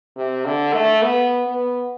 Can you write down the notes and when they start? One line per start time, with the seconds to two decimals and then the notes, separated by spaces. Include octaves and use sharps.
0.16 C3
0.45 D3
0.74 A3
1.03 B3
1.46 B3